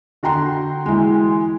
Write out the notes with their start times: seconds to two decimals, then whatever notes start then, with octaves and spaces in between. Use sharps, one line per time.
0.23 D3 F#4 G5 A#5 C6
0.86 E3 G#3